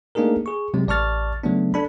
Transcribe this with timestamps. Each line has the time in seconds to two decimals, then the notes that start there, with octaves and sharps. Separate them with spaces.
0.15 A3 A#3 D4 D#4 G#4 A#4
0.46 G#4 C#6
0.74 C3 F#3 G#3 C4
0.88 A1 D5 A5 C#6 F6 A6
1.44 C#3 F#3 A3 B3 D4
1.74 D4 A4 B5